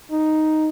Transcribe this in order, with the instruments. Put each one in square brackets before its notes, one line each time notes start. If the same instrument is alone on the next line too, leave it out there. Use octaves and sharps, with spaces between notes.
[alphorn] D#4